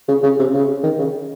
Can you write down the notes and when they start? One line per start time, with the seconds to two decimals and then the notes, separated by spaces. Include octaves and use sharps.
0.08 C#3
0.23 C#3
0.39 C3
0.54 C#3
0.84 D#3
0.99 C#3